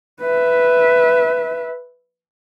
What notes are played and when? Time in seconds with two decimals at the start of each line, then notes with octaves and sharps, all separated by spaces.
0.21 B4 E5